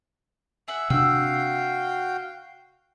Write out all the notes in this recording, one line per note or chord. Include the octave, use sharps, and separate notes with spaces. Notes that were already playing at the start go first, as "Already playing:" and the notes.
G#4 E5 F#5
C3 D4 F#4 F5 G5 E6